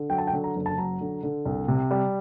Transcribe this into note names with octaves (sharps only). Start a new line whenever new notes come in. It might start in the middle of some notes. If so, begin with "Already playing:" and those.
Already playing: D3
F#3 G5
A5
G5
D3
A#5
F#1
A5
F#3 A#5
D3
D3
C2
C3
G3